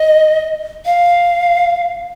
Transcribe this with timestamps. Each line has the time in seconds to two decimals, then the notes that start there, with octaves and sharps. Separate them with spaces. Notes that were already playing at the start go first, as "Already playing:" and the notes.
Already playing: D#5
0.85 F5